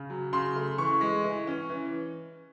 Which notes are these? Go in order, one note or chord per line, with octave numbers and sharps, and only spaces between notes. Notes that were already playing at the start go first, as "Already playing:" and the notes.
Already playing: C#3
F#3
C#3 C6
A3
E3 C#6
G#3
E3
C#4
E3